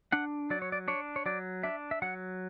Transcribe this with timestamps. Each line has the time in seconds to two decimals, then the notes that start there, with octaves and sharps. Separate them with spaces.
0.12 D4 F#5
0.50 F#3 D5
0.62 C#5
0.72 D5
0.88 D4 C#5
1.16 C#5
1.26 F#3 D5
1.63 D4 E5
1.91 E5
2.02 F#3 F#5